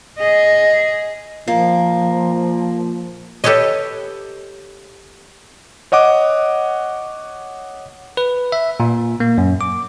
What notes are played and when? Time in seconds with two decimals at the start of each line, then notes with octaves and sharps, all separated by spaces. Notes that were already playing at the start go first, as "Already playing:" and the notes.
0.18 G#4 D#5
1.48 A#2 F3 A#3
3.44 G4 A4 B4 C#5 D#5
5.92 C#5 D#5 F#5 D6
8.17 B4
8.52 E5
8.80 A#2
9.20 A#3
9.38 F#2
9.61 D6